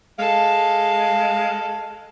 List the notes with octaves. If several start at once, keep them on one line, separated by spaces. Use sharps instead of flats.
G#3 A4 F5